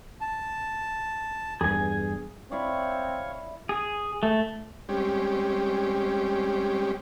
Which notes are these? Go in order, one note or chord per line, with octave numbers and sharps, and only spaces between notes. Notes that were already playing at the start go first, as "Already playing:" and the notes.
A5
E2 G2 G#4 G#5
C4 E4 C#5 D5 F5 C#6
G#4
A3
G3 G#3 C4 C#4 G4